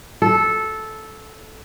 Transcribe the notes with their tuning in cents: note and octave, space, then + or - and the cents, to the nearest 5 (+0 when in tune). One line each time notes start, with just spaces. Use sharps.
A4 -10